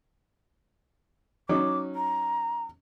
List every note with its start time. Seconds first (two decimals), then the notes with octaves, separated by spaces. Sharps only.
1.49 F#3 C#4 D#4 D6
1.95 A#5